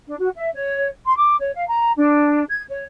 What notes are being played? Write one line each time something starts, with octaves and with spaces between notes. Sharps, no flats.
D4
F#4
E5
C#5
C6
D6
C#5
F5
A#5
D4
G#6
C#5